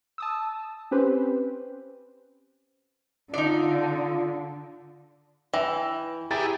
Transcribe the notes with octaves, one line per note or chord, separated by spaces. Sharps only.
A5 D#6 E6
C4 C#4 G4 B4 C5
D3 D#4 F4 D5
E3 G5 E6 A#6
E4 G4 G#4 A#5 A6